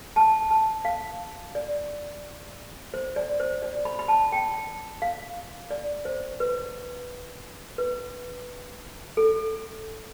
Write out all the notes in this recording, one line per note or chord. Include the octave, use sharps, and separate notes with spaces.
A5
A5
F5
D5
C5
D5
C5
D5
B5
B5
A5
G5
F5
D5
C5
B4
B4
A4